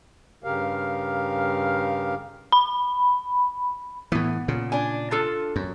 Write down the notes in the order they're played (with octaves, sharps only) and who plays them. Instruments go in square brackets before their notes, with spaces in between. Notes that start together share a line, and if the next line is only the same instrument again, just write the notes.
[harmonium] G2 C#3 G4 A#4 F5
[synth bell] B5
[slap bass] A2 E3 [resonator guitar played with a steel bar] B3
[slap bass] A#2 C#3
[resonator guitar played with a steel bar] D4 G#5
D4 F4 A4
[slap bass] F#2